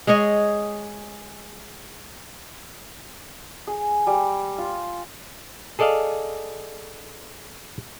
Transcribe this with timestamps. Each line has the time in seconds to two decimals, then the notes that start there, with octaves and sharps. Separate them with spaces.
0.07 G#3 G#4 C#5 D#5
3.67 G#4
4.07 G3
4.58 F4
5.79 G#4 A4 D5 D#5 F5